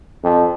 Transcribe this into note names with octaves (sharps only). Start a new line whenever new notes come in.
F2